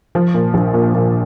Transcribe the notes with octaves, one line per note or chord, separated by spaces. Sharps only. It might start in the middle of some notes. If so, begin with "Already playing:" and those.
F3
A#2
A#1
A#2
A#2